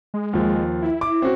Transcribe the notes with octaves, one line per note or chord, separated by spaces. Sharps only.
G#3
D#2 F3
E4
D6
C4 C#4 F#4